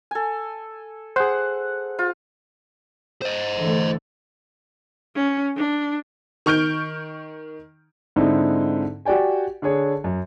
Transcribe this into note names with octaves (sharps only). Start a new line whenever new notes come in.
A4 G#5
G#4 C5 F#5
F4
C5 D#5
D3 E3 A3
C#4
D4
D#3 C#6 F6 G6 D7
G#2 D3 C4 D#4 E4
F#4 G4 D5 G5 G#5
D3 D4 G#4 C#5
F#2